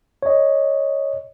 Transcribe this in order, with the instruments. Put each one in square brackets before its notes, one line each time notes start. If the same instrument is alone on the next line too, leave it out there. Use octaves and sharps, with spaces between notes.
[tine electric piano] C#5 D#5